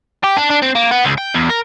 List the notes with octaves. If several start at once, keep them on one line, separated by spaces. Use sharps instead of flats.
G4
D4
D4
C4
A#3
B3
C#2
G5
E2
A#4